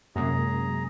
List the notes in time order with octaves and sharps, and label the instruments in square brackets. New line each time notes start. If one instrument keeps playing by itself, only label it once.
[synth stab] F#2 [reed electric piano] C3 G#3 A#3 [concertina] G#4 A#5